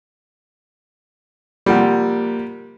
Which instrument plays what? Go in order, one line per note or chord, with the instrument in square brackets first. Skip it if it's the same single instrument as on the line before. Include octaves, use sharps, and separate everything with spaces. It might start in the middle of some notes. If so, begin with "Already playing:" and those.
[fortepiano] C3 F3 G3 [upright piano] A#3 F#5